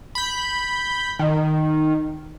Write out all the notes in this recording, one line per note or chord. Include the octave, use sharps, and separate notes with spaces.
B5 G6
D#3